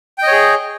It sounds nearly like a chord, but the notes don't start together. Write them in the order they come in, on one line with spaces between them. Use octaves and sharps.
G5 D#5 C#5 G#4